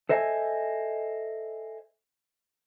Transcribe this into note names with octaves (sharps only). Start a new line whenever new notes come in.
A4 C5 D#5 E5 G5 G#5